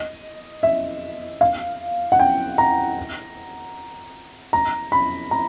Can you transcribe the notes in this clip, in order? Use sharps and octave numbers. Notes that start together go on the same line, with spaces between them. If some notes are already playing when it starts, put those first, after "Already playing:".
Already playing: D#5
E5
F5
F#5
G5
A#5
A#5
B5
A#5